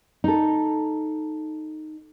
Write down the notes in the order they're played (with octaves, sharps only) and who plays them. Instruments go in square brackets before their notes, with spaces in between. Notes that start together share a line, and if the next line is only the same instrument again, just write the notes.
[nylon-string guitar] D#4 A4